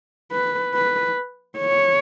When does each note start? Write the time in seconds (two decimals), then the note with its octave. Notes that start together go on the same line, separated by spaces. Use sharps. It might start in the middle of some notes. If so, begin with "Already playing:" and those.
0.32 B4
0.74 B4
1.59 C#5